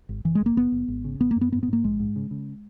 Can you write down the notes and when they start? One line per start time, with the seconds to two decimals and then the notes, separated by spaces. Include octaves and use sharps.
0.09 G#1
0.24 F#1 E3
0.35 G#3
0.41 F#1
0.46 A#3
0.56 F#1 B3
0.72 F#1
0.88 G#1
1.04 C#3
1.20 G#1 B3
1.31 A#3
1.36 F#2
1.41 B3
1.52 G#2 B3
1.63 B3
1.68 G#2 A#3
1.84 A#1 G#3
2.00 G#2
2.16 C#3
2.31 C#3